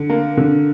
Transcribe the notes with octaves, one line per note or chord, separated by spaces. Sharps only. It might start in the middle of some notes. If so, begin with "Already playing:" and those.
Already playing: D3
A#3
D3